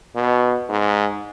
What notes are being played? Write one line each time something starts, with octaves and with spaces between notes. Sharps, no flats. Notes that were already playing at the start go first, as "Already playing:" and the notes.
B2
G#2